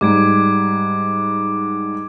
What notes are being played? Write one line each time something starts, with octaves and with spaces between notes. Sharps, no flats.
G#2 G3 D6 G#6 D7